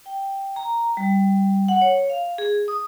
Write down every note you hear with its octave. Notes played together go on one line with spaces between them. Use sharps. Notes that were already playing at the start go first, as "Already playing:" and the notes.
G5
A#5
G3
F#5
C#5
F5
G#4
D#6